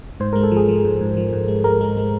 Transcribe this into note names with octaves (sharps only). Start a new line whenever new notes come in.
G#2 C5
G#3 A#4
A4
F3
G#4
F3
G#2
G#2
F3
G#2
G#3
G#3 A#4
G#3
G#3